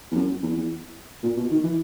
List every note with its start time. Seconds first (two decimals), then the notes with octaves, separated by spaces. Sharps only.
0.11 E2
0.15 F#2
0.42 E2
0.57 E2
1.23 A#2
1.36 B2
1.50 D#3
1.63 E3